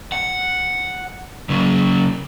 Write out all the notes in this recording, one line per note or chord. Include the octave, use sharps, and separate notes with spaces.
F#5
C#3 F#3